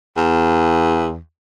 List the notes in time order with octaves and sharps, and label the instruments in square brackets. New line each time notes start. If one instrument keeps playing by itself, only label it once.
[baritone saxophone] E2